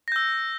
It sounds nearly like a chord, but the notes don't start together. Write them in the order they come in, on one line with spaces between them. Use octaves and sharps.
A#6 G6 E6